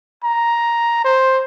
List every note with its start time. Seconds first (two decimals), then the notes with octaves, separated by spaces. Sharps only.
0.24 A#5
1.05 C5